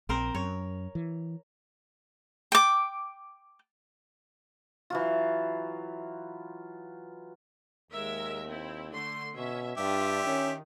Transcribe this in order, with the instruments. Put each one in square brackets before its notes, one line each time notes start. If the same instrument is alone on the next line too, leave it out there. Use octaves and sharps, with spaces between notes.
[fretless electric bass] A#1 [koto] C4 A#4 C5
[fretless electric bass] F#2 [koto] C#5
[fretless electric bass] E3
[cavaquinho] G5 D6
[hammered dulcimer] E3 F#3 F4
[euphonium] D#2 [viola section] G#3 A#4 E5
[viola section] C4 E4
D3 A3 C6
[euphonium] B2 [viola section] C#4 E5
[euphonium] G2 [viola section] D4 F4 [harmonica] G4 E5
[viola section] D#3 [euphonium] C#4